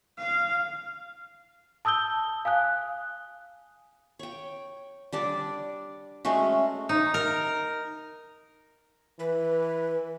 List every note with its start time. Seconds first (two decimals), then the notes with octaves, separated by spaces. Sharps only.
0.18 F5
1.85 A5 D#6 E6 G6 G7
2.45 F5 G#5 D#6 F#6
4.19 C#5 G5
5.12 G3 D4 D5
6.25 G#3 A3 C#4 F#4
6.89 D#4
7.14 A#4
9.19 E3 B4